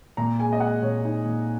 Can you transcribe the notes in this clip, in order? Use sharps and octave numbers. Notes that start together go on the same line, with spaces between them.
A#2 A#5
G#3 G#5
D#5
G#3 F#5
A#2 C#5
D#4
A#2